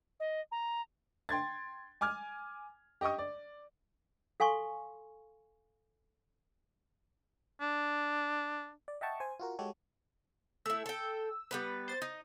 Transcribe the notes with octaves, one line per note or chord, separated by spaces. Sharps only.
D#5
A#5
G5 C6 G#6 A6
G#5 D6 F6 G#6
G4 D#5 G5 C#6 D#6
D5
A4 F5 G#5 C6 C#6
D4
D5
D#5 E5 F#5 G5 A5 C#6
C5 G#5
F4 F#4 A#4
G#3 F#4 G4 A4 C#5
A3 E4 E6
A4 G5
G3 B3 B4
C5 A6
D#4 D#6